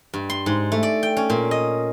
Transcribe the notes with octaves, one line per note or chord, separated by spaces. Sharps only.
G2
C6
G#2
A3
D5
G5
C#4
A#2
D#5